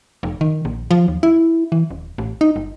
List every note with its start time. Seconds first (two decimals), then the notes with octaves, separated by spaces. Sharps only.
0.23 F1
0.41 D#3
0.65 A#1
0.91 F3
1.08 D#2
1.23 E4
1.72 E3
1.91 D#1
2.18 A1
2.41 D#4
2.56 G1